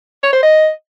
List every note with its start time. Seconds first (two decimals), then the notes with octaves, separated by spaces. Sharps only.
0.23 C#5
0.33 C5
0.43 D#5